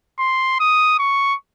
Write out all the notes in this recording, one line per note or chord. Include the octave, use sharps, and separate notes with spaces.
C6
D#6
C#6